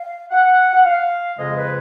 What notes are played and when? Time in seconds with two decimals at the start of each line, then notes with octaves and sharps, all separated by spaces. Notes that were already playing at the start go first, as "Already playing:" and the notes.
Already playing: F5
0.31 F#5
0.73 F#5
0.84 F5
1.37 F2 C#3 G#3 D#5
1.56 B4